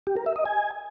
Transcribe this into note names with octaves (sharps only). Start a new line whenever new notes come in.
G4
A#4
E5
D#5
G#5